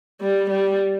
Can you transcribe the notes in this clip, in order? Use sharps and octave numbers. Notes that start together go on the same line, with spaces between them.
G3
G3